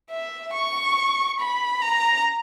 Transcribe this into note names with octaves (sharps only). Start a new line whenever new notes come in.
E5
C#6
B5
A#5